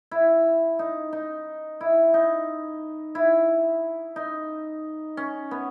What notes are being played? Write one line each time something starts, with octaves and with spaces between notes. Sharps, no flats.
E4
D#4
D#4
E4
D#4
E4
D#4
C#4
B3